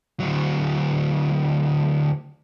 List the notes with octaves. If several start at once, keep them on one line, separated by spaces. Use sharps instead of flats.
D2 F#3